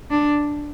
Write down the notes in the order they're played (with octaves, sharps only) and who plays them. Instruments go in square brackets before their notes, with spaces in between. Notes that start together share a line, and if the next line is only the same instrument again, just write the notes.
[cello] D4